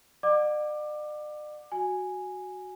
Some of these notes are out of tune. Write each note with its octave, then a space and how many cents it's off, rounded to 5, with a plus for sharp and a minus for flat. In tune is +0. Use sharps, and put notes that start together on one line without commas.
D5 +45 F#5 -20 D6 +20
F#4 +0 G#5 +0